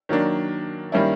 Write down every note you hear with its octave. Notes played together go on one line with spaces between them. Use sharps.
D#3 F#3 A#3 D4
D#3 G3 A#3 C#4 E4